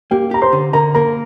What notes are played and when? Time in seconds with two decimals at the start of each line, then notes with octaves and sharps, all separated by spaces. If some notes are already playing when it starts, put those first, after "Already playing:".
0.11 A#3 G4 G5
0.31 G4 A#5
0.42 C5 C6
0.53 D3
0.73 D3 A#4 A#5
0.95 A#3 A#4 A#5